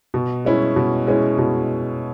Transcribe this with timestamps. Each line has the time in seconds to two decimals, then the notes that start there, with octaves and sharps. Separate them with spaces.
0.14 B2
0.45 G#3 C#4 E4
0.76 B2
1.07 G#3 C#4 E4
1.38 B2